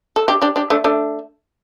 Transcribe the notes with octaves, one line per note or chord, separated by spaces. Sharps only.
A4
D4 G4
D4 G4
D4 G4
A3 D4
A3 D4